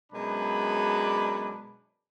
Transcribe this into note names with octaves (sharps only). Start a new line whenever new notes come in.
F#2 B2 G#3 D4 B5